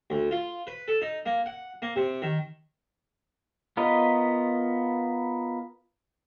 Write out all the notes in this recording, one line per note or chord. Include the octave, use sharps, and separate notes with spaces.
D2
F4
B4
A4
D#4
A#3
F#5
A#3
C3
D#3
B3 F4 A#4 B4 D#5